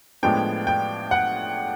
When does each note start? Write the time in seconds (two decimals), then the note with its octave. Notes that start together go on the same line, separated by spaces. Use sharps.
0.23 A2 F3 G#3 B3 D4 G5
0.67 G5
1.11 F#5